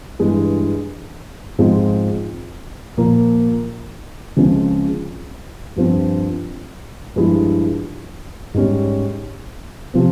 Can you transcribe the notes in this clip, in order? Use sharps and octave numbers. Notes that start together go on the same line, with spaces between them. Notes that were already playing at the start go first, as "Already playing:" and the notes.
G2 E3 G#3
G#2 F3 G#3 C4 F4
A#2 F3 A#3
C#2 C#3 F3 G#3 C4
G2 F3 C4
G2 F3 G#3 E4
G#2 G3 C#4
C3 F3 C4